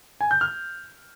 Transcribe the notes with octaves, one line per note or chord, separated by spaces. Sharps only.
G#5
G6
F6